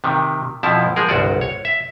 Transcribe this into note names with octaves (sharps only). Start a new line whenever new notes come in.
C3 D#3
F2 B2 F3 E4 A5
F3 G#3 G#4 A#4
G1 C2 F#4 D5
C#5
E5